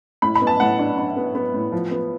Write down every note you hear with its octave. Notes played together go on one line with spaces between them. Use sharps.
A2 B5
B5
B3
A5
A2 F#5
D4
D4
B3
B3
A2
F3
B3